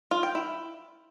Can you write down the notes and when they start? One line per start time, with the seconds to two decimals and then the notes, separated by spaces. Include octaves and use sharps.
0.11 F4
0.23 G5
0.35 E4